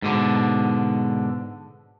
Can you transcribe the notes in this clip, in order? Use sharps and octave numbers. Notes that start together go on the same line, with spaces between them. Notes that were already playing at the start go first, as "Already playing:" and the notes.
G#2 B2 D3